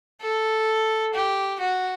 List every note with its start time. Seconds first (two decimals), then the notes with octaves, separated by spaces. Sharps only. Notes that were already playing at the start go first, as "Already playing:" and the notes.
0.21 A4
1.14 G4
1.60 F#4